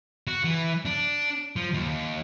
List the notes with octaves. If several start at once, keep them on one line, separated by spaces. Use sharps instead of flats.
F#4
E3
D4
F3
D#2